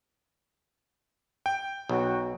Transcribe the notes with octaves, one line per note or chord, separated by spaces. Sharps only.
G5
B1 F#4